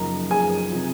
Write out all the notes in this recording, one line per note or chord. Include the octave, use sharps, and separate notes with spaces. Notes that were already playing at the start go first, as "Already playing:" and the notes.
Already playing: F#2 C#3 F3 A#3 D#4 A#5
G#4 G#5
C3 F3